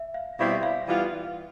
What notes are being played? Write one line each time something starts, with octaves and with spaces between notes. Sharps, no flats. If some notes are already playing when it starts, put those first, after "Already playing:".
Already playing: E5
F5
B2 G3 C4 E4 G4 F5
E5
F5
E3 G3 B3 F4